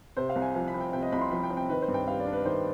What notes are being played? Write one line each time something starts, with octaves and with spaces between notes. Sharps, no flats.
C3 C5
F5
C2
G#5
F3 G#5
B5
C4
G5
C3 G5
D#5
C2 B5
C6
F3 B5
G5
C4
G5
D#3 B4
C5
G2
G5
G3 F5
D5
D4
B4
D#3 C5